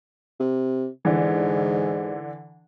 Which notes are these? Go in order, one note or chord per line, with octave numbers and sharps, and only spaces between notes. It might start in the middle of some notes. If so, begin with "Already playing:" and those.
C3
G#2 D3 E3